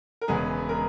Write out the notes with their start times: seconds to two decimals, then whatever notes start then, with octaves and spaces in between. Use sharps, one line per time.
0.21 A#4
0.28 E1 E2 C#3 G#3 B3 G#4
0.69 A#4